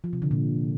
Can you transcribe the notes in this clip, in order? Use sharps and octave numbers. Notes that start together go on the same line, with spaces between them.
F3
C3
D3
A#2